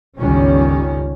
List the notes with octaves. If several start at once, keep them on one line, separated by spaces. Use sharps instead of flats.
G1 C#2 D#3 G3 C#4